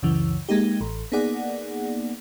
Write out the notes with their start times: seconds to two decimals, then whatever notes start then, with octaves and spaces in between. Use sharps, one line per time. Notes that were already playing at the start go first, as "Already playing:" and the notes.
0.03 C#2 F#2 C#3 E3
0.49 G#3 A#3 D#4 G4
0.81 A1
1.12 A#3 B3 D#4 G#4 D5 F#5